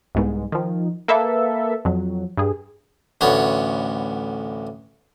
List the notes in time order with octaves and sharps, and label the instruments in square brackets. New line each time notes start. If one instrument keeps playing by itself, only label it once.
[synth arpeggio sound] C2 G#2 B3
D#3 F3
A#3 A4 B4 E5
F2 F#3
G2 G#4
[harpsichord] A1 D2 B3 C#5